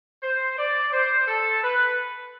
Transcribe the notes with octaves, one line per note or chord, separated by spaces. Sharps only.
C5
D5
C5
A4
B4